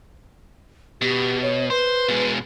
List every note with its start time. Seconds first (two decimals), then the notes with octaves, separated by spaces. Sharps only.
1.01 B2 G4
1.42 C#5
1.70 B4 C5
2.09 B2 G#3